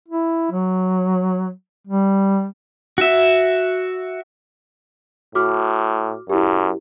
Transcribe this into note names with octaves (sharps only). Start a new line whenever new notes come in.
E4
F#3
G3
F#4 E5
A2 F#4 D6 F6
F#2 E4 G4